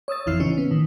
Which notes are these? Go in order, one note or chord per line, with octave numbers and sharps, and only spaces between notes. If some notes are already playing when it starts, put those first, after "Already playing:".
C#5 D#6 E6 A6
A1 F2 E3 E4 F6 C7
C#3 E3 C#4 D#4
B3
A2 D#3